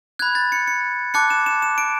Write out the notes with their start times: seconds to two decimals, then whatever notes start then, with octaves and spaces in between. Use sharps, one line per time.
0.19 B5 F#6 G#6
0.35 A6
0.52 C#7
0.67 C#7
1.14 A5 D6 F#6 C#7
1.30 E7
1.46 E7
1.62 E7
1.78 D7